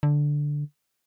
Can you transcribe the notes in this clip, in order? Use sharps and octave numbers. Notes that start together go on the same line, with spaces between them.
D3